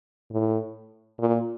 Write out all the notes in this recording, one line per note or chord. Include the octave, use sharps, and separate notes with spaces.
A2
A#2